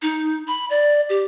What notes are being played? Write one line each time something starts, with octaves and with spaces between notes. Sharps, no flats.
D#4
B5
D5
G4